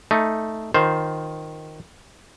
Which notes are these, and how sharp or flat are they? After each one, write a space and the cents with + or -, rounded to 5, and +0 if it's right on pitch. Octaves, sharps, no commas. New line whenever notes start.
A3 +0 D#4 +0
D#3 +0 F4 +20 C5 +0